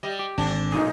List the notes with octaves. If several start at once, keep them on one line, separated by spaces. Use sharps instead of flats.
G3 D#5
G4
G#1 D3 C4 D4
B1 A#2 D#4 G#4